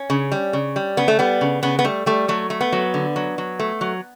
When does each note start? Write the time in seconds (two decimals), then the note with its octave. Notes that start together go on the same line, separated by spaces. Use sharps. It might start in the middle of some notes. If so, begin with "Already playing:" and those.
Already playing: C#4
0.10 C#3
0.32 G3
0.53 C#3
0.76 G3
0.97 C#3 B3
1.08 A3
1.19 G3 B3
1.41 C#3
1.63 C#3 B3
1.79 B3
1.85 G3 A3
2.06 G3 A3
2.28 F#3 A3
2.50 A3
2.61 B3
2.72 F#3
2.94 D3
3.16 F#3
3.38 F#3
3.60 A3
3.81 F#3